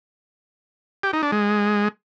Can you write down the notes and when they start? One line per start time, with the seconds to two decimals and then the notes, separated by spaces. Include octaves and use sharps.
1.03 G4
1.13 D#4
1.23 D4
1.32 G#3